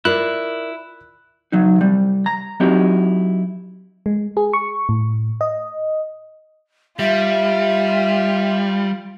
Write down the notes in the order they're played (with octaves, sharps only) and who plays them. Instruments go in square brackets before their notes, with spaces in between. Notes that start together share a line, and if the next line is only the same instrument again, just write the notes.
[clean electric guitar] E4 [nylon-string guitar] F4 A#4 D5 [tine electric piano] F#6
[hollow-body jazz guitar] C#2 F#3 D#4
C3 G3
A#5
F#3 C4 D#4 E4 F#4 G4
[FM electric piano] G#3
G#4
C#6
A2
D#5
[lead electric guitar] G3 [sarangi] F4 [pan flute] E5